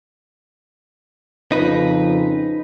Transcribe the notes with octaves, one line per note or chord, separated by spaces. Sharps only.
F2 C#3 F3 D#4 B4